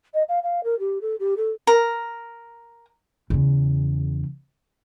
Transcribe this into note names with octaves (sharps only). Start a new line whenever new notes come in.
D#5
F5
F5
A#4
G4
A4
G4
A4
A#4
E2 C#3